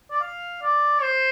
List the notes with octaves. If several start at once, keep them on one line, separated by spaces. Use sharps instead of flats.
D5
F5
D5
C5